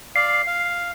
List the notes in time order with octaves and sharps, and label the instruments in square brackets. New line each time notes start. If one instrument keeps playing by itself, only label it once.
[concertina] D5 F5 [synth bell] C7
[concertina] F5